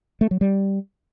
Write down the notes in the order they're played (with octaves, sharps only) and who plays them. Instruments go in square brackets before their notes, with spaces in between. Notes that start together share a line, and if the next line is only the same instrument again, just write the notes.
[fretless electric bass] A3
F#3
G3